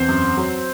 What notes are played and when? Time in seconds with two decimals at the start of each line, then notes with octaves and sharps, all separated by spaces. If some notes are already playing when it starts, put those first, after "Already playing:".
Already playing: E2 C4 C5
0.08 F#2
0.37 F#3